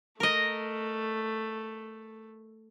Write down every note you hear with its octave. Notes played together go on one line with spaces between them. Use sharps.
A3 A#4 D#5